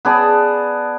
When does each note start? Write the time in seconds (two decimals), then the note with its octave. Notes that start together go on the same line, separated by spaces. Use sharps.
0.05 B3 G#4 D5 A5